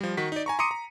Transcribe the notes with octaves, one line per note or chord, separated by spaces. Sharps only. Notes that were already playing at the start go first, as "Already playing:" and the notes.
F3 G3
D#3 F#4 B6
D#4 D5
G#5 A#5 C#6
A#5 C6 D6 D#6 C#7 D#7
A#5